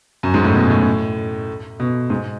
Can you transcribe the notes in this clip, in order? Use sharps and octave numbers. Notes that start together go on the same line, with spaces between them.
F#2
G#2
A2
B2
A2
B2
G#2